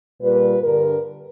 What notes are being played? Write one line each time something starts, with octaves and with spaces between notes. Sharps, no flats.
A#2 G3 B4
G2 D3 G3 A#4